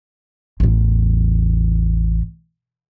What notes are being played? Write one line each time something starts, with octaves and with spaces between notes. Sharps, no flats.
A1 E2